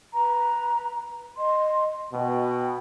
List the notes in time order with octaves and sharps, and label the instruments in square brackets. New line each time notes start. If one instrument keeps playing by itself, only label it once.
[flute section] B4 A#5
D#5 C6
[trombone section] B2 [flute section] G5